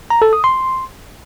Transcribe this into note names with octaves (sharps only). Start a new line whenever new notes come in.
A#5
A4
D#6
C6